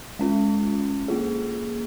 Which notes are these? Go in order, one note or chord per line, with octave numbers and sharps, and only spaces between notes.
G#3 C#4 F4
A#3 F4 G#4